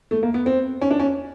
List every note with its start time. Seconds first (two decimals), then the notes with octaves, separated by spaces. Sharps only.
0.11 A3
0.23 A#3
0.34 B3
0.46 C4
0.81 C#4
0.91 D4
1.00 C#4